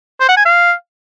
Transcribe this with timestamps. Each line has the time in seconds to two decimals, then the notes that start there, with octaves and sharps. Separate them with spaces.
0.20 C5
0.29 F#5
0.37 G#5
0.46 F5